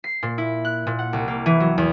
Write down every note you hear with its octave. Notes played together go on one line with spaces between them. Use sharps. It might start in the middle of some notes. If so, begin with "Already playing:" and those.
C7
A#2
E4
F#6
A#2
F#5
C2
A#3
E3
F#3
E2